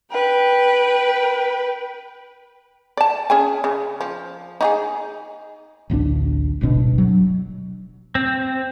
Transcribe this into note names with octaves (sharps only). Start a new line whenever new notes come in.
B4 G5
D5 A5
C#4 G#4 G#5
C#3
F3
D#4 F#4 G#4
A1 D2 A#3 D4
D1 G1 B2 D4
F#3
C4